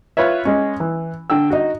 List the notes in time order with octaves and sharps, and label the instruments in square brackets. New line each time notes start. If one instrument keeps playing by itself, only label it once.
[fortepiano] F4 B4 C#5 E5
G#3 C#4
E3
D3 G5 E6
D#4 F#4